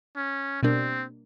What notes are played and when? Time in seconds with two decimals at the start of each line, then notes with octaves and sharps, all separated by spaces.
0.16 C#4
0.63 B2 G3 A#3 C4 D4